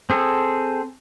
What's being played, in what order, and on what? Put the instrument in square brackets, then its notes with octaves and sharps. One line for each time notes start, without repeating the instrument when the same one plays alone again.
[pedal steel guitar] C4 G#4 A4